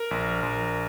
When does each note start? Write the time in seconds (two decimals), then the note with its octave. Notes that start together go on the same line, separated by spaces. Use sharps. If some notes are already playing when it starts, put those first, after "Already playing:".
Already playing: A#4
0.11 A#1
0.43 A#1